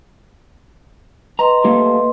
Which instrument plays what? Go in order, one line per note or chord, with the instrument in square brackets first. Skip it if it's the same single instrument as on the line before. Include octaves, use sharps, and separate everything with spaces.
[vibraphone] B4 D#5 C6 [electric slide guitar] A#5
[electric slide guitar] A3 A#3 G4